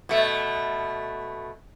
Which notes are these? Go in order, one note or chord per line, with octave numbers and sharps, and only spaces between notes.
B2 A3